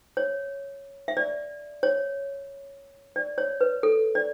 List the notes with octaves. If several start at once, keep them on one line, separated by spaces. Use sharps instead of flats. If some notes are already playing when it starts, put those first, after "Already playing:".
C#5
E5
D5
C#5
D5
C#5
B4
A4
D5